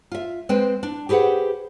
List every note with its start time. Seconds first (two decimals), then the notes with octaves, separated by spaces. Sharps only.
0.12 F4 E5
0.49 G#3 C4 B4 C5 G5
0.83 D4
1.09 G4 G#4 B4 C5 F#5